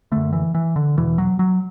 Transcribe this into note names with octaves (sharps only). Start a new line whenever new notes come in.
F#2 D3 A3
E3
E3
D3
E2 B2 E3
F#3
F#3